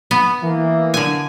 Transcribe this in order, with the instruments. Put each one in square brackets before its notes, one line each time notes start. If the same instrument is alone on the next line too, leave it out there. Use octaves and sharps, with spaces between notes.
[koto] B3
[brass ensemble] E3 A#3
[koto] D3 G#5